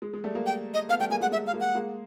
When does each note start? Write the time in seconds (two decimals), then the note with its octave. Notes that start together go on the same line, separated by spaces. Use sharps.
0.02 G#3
0.14 G#3
0.24 G3 A3
0.35 G#3 A#3
0.46 G5
0.74 D#5
0.89 A3 B3 F5
0.99 G3 A3 G5
1.10 G#3 A#3 G#5
1.21 G#3 F#5
1.32 G#3 E5
1.47 F5
1.53 G#3 A#3
1.60 F#5
1.75 G#3 A#3